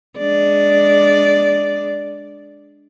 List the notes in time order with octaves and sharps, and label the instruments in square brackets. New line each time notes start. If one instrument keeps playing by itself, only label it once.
[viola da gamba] G#3 D4 D5